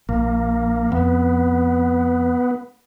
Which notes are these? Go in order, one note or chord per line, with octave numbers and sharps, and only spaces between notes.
A#1 A#3
F2 B3